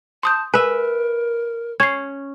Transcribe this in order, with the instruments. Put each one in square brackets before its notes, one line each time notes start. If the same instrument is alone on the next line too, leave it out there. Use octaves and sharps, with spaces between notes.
[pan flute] A5 [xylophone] C6 D#6 G6
[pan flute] A#4 [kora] B4 E5 [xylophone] G#5
[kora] C#4 [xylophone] G#6 C7